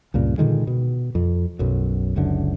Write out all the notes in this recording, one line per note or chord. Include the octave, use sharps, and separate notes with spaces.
C#2 G2 A#2
A#2 D3 D#3 G#3
B2
F2
B1 F#2
F#1 C#2 F#2 D3